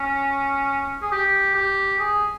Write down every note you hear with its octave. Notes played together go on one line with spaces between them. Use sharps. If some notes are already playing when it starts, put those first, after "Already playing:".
Already playing: C#4
G#4
G4
G4
G#4